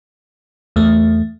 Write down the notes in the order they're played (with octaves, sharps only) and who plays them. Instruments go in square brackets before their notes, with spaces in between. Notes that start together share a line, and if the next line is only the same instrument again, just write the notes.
[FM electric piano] E2 A3